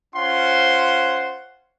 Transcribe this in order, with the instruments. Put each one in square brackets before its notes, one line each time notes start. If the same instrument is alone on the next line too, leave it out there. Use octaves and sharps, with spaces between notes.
[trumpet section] C#4 F4 C5 F#5 C6